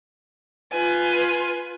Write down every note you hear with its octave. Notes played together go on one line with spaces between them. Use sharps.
F4 B4 G#5